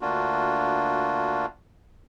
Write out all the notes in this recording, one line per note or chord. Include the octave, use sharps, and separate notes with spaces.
D2 A#3 D4 F4 F#4